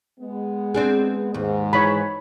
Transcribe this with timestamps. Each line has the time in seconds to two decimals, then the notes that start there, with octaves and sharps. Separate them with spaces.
0.20 G#3 B3
0.74 C4 D4 G#4
1.34 D#2 G#2
1.73 E3 C#5 B5